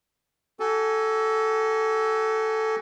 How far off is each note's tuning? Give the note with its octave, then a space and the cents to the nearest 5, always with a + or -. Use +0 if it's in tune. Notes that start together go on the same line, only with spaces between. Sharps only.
F#4 +40 A4 +0 G#5 -5